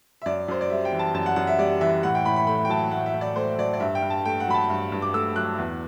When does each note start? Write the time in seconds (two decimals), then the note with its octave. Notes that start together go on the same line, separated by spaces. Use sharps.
0.22 E5
0.26 F#2 D5
0.48 F#2 C5
0.61 D5
0.70 G3 E5
0.85 G5
0.92 E3
0.99 A5
1.14 F#2 A5
1.26 F#5
1.36 F#2 F#5
1.47 E5
1.59 G3 D5
1.81 E3 E5
2.03 A2 F#5
2.15 G5
2.25 A2 B5
2.36 B5
2.47 A3 B5
2.65 G5
2.69 F#3 A5
2.91 A2 F#5
3.06 E5
3.14 A2
3.21 D5
3.36 A3 C5
3.58 F#3 D5
3.73 D5
3.80 G2 E5
3.95 G5
4.02 G2
4.10 A5
4.25 A3 G5
4.40 F#5
4.47 F#3 B5
4.54 A5
4.70 G2
4.92 G2
5.02 D6
5.14 A3 E6
5.36 F#3 F#6
5.58 E2